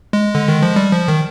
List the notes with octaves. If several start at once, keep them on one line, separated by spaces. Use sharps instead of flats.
G#3
D3
D#3
F3
G3
F3
D#3